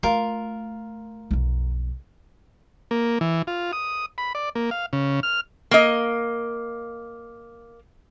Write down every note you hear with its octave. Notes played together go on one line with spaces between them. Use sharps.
A3 F4 A#4
B1 F2
A#3
E3
F4
D#6
B5
D5
A#3
F5
C#3
F6
A#3 D#5